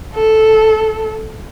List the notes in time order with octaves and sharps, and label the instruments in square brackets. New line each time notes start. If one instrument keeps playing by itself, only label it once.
[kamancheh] A4